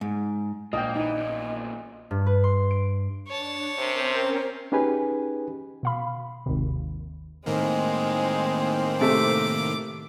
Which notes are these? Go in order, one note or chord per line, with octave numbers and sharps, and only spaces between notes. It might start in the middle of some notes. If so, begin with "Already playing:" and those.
G#2
A#1 A#3 D#5 G5 A6
E3 D#4 D#5
E2 A#2
G2
B4
C6
D7
D4 C#5 A5
C3 C4 C#4 A#4 C5
C#4 D#4 G4 G#4 B4 G#5
B2 F5 B5
G#1 D#2 C3
A2 D#3 G#3 A#3 C4 C5
C3 A3 D6